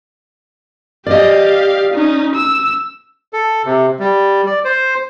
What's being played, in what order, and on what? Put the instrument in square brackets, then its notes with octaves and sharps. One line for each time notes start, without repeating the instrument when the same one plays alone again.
[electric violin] G4 F5 [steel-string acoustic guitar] D5 D#5
[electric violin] C#4 D#4
E6
[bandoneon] A4
C3
G3
D5
C5